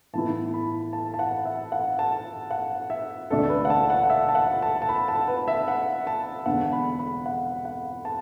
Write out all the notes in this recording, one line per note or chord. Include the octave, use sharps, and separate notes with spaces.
A2 E3 B3 E4 A5
B5
A5
A5
F#5
E5
F#5
A5
F#5
E5
E1 D2 D3 A3 D4 A4
B4
F#5
A5
F#5
F#5
E5
A5
F#5
A5
A5
B5
A5
B4
E5
F#5
A5
E1 E2 D3 B3 D4 F#5
B5
B5
F#5
F#5
A5